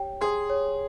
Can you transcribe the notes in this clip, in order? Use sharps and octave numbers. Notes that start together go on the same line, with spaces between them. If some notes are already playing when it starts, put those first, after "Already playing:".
Already playing: G4 C#5 G5
G#4 C6
C#5